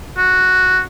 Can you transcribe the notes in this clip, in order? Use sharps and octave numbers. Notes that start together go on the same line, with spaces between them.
F#4